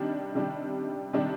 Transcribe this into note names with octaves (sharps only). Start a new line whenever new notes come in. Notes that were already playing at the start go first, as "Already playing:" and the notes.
Already playing: C3 D#3 G3 D4
C3 D#3 G3 D4 G4
C3 D#3 G3 D4 G4